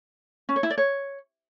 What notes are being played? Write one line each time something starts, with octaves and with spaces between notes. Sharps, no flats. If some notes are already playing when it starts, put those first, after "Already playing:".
C#4
C#5
E4
D5
C#5